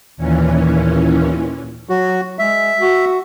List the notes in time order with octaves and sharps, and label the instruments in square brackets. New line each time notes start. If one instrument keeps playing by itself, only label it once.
[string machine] D#2 A#2 E3 C#4
[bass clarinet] F#3 [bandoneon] F#4
[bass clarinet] G#3 [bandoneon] E5
[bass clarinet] F#4